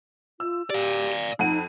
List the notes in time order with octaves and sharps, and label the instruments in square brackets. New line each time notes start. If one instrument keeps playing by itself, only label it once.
[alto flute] F4 [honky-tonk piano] E6
[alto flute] G4 [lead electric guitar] D5 F5
[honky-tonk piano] F2 F#5 D#7 [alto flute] D#4